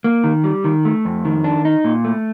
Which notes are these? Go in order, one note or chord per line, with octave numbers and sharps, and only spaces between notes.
A#3
D#3
G3
D#3
A3
F2
D#3
D4
D#4
A#2
A3